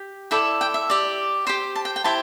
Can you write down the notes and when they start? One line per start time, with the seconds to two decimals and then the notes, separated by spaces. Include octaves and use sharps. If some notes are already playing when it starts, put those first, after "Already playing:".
Already playing: G4
0.31 E4 A4 D5 G5
0.61 G5
0.74 E5
0.90 G4 D5
1.47 G4 C5 G5
1.75 A5
1.85 G5
1.96 G5
2.04 E4 G4 C5 A5